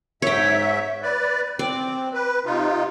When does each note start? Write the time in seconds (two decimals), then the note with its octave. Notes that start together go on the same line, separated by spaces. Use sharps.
0.22 G#2 C#5 E5 G5
1.02 B4 D5
1.59 C4 D5
2.13 B4
2.46 C3 D#4 F4